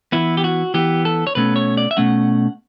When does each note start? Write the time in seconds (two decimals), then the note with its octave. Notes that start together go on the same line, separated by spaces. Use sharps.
0.12 E3 B3 E4
0.37 G4
0.44 F#4
0.74 E3 B3 G4
1.05 A4
1.27 C#5
1.35 B2 A3 C#4 B4
1.56 C#5
1.77 D5
1.91 E5
1.97 B2 A3 C#4 F#5